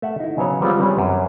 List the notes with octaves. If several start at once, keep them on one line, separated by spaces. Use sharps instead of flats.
A3 E5 F#5
D#4 E4
C#3 F#3 B3 C5 C#5
G3 G#3 B3 C4 F4 G#4
G3 C4 C#4 G#4 B4 C#5
F#2